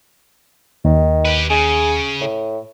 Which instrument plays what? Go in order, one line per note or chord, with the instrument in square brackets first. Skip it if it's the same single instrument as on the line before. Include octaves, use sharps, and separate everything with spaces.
[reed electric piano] D#2 [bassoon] D#3
[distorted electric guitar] G4 B4
[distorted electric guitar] C#3 [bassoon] G#4
[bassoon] A2